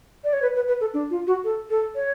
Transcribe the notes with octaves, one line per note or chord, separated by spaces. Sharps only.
D5
C#5
B4
B4
B4
A4
D4
F4
F#4
A4
A4
C#5